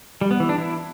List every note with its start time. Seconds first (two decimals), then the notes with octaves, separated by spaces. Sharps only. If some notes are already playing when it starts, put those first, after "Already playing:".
0.21 G3
0.31 B3
0.40 E3
0.49 D4
0.59 E4